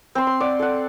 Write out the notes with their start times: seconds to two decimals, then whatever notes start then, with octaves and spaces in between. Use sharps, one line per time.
0.15 C4 C6
0.27 C6
0.40 D5 F#5
0.59 A4 F#5